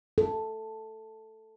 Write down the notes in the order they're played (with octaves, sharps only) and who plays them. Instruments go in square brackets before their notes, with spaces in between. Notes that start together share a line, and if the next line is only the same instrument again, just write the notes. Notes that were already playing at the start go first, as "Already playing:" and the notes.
[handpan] A4